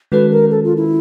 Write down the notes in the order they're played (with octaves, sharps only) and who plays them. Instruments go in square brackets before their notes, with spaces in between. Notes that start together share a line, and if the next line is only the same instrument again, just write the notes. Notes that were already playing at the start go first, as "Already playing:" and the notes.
[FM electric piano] D#3 G#3 C#4 F#4 A4 [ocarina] B4
[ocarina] A#4
A4
F4
E4